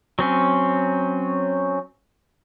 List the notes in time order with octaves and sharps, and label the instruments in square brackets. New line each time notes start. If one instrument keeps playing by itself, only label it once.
[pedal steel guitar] F#3 C4 C#4